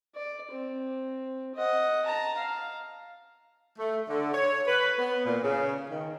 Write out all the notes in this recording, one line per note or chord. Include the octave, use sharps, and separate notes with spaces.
D5
C4
D#5 F#5
A5 A#5
F5
A3
D3
C#5
B4
B3
A#2
C#3
D#3